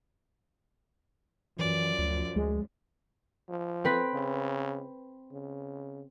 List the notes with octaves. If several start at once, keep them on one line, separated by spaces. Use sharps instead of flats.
F#2 E3 F3 D5
D2
D2 G#3
F3
C4 B4 B6
C#3
C#3